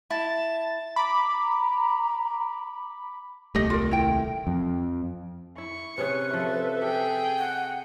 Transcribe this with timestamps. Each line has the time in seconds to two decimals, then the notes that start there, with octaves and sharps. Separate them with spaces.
0.10 E4 A5 A6
0.96 A#5 B5 D6
3.55 D#1 C2 A3 G4 D#5
3.70 F4 A#4
3.91 E4 G5
4.47 F2
5.58 E4 C#6
5.98 C3 C#4 G#4 B4
6.34 F3 A4 E5
6.82 G4 G#4 G5
7.39 F#5